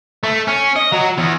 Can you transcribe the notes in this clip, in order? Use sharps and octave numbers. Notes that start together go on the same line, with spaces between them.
A3
C#4
D#5
F#3
E2